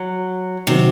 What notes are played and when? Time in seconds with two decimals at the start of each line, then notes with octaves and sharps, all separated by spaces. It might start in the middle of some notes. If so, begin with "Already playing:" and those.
Already playing: F#3
0.67 C3 D#3 F#3 C4